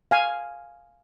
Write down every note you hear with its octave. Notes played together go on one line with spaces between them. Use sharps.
F5 G#5